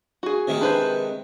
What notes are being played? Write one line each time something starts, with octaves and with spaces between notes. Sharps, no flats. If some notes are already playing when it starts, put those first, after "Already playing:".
F#4 G#4
C3 D#3 G#3
D4 B4 C5